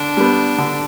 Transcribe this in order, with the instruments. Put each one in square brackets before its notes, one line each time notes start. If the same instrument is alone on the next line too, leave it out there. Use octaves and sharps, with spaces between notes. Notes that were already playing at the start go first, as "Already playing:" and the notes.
Already playing: [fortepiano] D3 [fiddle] D4
[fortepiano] G3 B3
D3